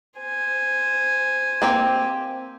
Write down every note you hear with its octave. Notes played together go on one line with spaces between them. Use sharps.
C5 G#5
A#3 C4 G4